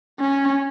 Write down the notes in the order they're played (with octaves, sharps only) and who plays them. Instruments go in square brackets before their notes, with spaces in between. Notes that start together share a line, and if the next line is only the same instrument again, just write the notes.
[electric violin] C#4